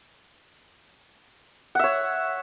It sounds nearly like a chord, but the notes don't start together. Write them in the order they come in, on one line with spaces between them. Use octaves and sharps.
F#5 E5 C#5